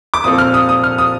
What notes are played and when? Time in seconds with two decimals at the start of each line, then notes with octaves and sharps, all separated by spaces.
0.14 D6
0.24 A#2 F3 C4 F4 A4 D#6
0.38 F6
0.54 D#6
0.69 D#6
0.84 F6
0.98 D#6